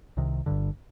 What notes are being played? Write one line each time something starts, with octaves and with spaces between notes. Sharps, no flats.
C2 C3 D#3
G1 G2 D3